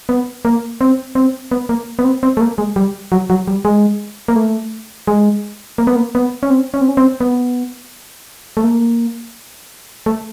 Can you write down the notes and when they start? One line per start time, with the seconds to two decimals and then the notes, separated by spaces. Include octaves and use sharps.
0.09 B3
0.45 A#3
0.81 C4
1.15 C4
1.51 B3
1.69 A#3
1.99 B3
2.04 C4
2.23 C4
2.37 A3
2.41 A#3
2.58 G#3
2.76 G3
3.12 F#3
3.30 F#3
3.48 G3
3.65 G#3
4.28 A#3
4.36 A3
5.07 G#3
5.78 A#3
5.87 B3
5.96 A#3
6.15 B3
6.43 C#4
6.50 C4
6.74 C#4
6.81 C4
6.88 C#4
6.97 C4
7.21 B3
8.57 A3
8.64 A#3
10.06 A3